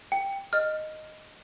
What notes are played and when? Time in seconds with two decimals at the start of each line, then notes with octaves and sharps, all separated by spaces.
0.12 G5
0.53 D#5 F6